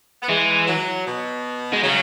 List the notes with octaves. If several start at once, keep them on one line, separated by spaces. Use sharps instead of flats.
B3
E3 G#3
F#3
B2
G#3
C#3 F#3